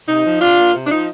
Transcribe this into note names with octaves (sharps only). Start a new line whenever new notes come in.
C3 D#4
F3
C3 D4 F4
A#3
C3
D4
F3 D#4